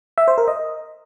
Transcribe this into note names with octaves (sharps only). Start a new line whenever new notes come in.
E5
C5
A#4
D#5